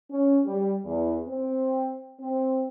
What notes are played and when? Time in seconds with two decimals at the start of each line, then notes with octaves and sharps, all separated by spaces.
0.11 C#4
0.45 G3
0.85 E2
1.27 C4
2.21 C4